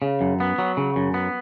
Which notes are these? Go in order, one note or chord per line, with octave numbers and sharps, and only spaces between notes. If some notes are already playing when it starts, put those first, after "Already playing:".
C#3
F#2
B3
F#3
C#3
F#2
B3